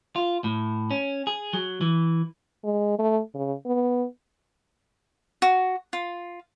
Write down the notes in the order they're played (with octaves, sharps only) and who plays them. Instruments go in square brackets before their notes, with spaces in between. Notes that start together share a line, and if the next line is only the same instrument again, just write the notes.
[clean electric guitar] F4
A2
C#4
G#4
F#3
E3
[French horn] G#3
A3
C#3
B3
[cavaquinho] F#4
F4